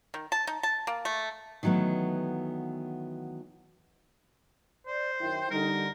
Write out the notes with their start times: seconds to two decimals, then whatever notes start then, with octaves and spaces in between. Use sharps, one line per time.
0.14 D#3
0.32 A5
0.47 D#4
0.63 A5
0.87 A#3
1.05 A3
1.63 D#3 E3 F#3 A3 B3
4.87 C5 D5
5.20 F#2 D#3 E4 G5
5.51 D3 G3 D#4 A#4